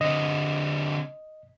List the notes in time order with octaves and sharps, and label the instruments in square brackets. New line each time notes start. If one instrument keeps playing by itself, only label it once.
[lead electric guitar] D3 C4 [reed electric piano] D#5